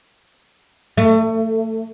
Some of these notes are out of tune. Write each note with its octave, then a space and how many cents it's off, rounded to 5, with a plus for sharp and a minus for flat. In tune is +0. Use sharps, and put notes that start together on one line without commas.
A3 +30